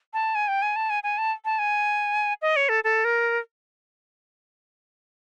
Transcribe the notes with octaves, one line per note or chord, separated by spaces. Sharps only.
A5
G#5
G5
G#5
A5
G#5
G#5
A5
A5
G#5
D#5
C#5
A4
A4
A#4